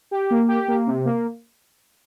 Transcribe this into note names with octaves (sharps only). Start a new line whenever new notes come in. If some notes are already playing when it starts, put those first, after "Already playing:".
G4
A#3
G4
A#3
C3
A#3